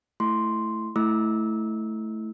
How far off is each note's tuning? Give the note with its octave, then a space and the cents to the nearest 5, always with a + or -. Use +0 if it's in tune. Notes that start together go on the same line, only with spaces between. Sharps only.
A3 +0 E4 +5 C6 +0
A3 +0 E4 +0 E6 -20